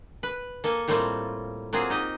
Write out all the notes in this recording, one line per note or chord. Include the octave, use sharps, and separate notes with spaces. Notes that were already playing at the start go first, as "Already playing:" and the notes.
B4
A#3 A4 G#5
A2 G3 A3 A#3 C4 F4
F#3 A#3 C4 F4 G#4
D#4 G4 D#5